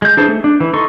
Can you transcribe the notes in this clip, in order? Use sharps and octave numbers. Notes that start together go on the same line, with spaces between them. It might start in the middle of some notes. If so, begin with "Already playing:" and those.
G#3 G6
E3 D4 G#4 C5 A5
A3
D4
E3
D#4 A4 C6 C#6